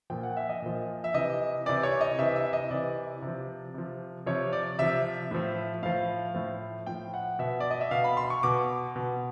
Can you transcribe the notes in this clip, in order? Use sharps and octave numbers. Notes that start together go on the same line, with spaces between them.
A#2 F3 G5
F#5
E5
D#5
A#2 F3
E5
C3 E3 D#5
C3 E3 D5
C#5
D#5
C3 E3 E5
E5
D#5
C3 E3 D5
C3 F3
C3 F3
C3 F3 C#5
D5
C3 F3 E5
A2 F3
A2 F3 F5
A2 F3
A2 F3 G5
F#5
B2 E5
D5
D#5
E5
B2 F5
B5
C6
C#6
B2 D6
B2